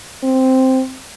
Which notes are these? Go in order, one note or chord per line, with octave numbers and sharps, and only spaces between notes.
C4